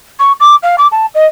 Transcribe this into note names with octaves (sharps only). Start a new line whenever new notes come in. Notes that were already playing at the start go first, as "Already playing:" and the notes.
C#6
D6
F5
D6
A5
D#5